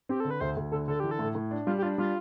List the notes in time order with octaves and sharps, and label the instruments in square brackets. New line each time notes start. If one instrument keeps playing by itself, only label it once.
[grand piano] C4 [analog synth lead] G4
[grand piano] D3 [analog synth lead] A4
[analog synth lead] B4
[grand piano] D2 [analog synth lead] C5
[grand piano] D2
[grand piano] D3 [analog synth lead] A4
[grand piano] D3 [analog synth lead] A4
[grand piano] E3 [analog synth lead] G4
[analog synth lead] A4
[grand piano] A2
A2
D4
[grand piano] G3 [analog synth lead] F4
[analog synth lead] G4
[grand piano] D4 [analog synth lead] F4
[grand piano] G3 [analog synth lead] F4